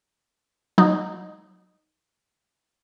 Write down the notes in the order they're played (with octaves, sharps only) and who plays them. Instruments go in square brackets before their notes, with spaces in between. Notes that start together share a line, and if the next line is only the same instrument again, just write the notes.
[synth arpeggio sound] F#3 D#4